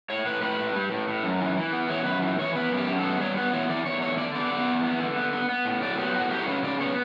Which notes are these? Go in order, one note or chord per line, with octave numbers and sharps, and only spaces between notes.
A2 C#5
A2 B4
A2 B4
A2
G3
A2
A2
F#2
E3
E3
B3
E3 C#5
F#2 B4
E3
E3 C#5
B3 B4
F#2
G4
F#2
A4
B3
G3 C#5
B3 B4
E3 C#5
E3 D5
E2 C#5
D3 C#5
D3 D5
B3 D5
B3
E2
B3
D3
B3
B3
B3
A2
F#3 D5
B3 G4
A2 F#4
F#3 G4
C#5
C#3 B4
C#3 D5
B3 C#5